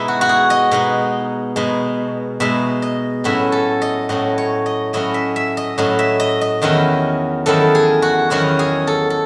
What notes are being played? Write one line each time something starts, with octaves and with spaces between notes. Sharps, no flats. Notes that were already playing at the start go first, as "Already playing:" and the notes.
Already playing: B2 G#3 D#4 E4
F#4
F#4
G#4
D#5
B2 G#3 D#4
B2 G#3 D#4
B2 G#3 D#4 E5
D#5
A2 F#3 C#4 E4 E5
A4
D#5
A2 F#3 C#4 E4 D#5
C#5
D#5
A2 F#3 C#4 E4 D#5
E5
E5
D#5
A2 F#3 C#4 E4 D#5
E5
D#5
D#5
E2 D#3 F#3 C#4 E4 D#5
E2 D#3 F#3 C#4 E4 A4
G#4
F#4
E2 D#3 F#3 C#4 E4 F#4
G#4
A4
A4